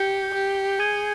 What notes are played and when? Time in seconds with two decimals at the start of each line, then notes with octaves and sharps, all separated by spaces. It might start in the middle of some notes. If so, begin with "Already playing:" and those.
Already playing: G4 G6 C#7 G7
0.34 G4
0.79 G#4 G#6 D#7 G7